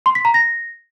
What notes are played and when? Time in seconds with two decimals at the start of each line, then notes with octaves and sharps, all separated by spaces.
0.06 C6
0.15 B6
0.25 A#5
0.34 A#6